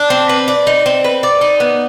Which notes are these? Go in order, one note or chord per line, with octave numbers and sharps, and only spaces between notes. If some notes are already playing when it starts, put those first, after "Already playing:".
Already playing: D4
C4
B4
D5
D#4
C4
B4
D5
D#4
B3